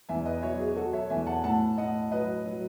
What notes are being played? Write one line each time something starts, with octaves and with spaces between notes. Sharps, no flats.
E2 E5 G#5
B4 D#5
F#3 C#5 E5
G#4
F#3 F#4 A4
C#5 E5
E2 E5 G#5
F#5 A5
A2 F#5 A5
A2 D#5 F#5
F#3 B4 D#5
F#3